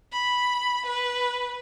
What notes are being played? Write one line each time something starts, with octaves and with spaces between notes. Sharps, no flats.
B5
B4